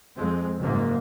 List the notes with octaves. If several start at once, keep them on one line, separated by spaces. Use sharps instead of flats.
F2 G#3 C4
F#1 G#2 A#3